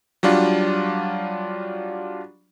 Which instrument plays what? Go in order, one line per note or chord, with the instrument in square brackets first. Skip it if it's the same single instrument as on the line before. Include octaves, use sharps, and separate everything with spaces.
[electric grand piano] F#3 G3 D4 F4